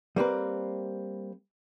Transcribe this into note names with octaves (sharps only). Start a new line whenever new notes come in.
G3 A#3 C4 B4